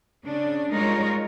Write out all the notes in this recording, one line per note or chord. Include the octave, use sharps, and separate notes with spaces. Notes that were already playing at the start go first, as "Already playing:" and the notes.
C#3 D4
G3 G#3 D#4 F4 A#4 C#5